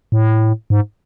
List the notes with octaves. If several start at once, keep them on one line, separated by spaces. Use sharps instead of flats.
A2
G#2